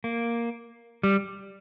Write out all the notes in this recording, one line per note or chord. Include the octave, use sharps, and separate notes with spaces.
A#3
G3